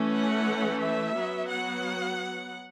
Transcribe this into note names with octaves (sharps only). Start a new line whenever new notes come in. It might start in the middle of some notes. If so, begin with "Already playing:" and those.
Already playing: E3 A3 C#4
F#5
E5
F#3 B3
F#5